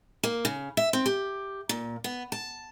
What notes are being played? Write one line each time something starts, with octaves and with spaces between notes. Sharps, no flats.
A#3
C#3
E5
C4
G4
A#2
B3
A5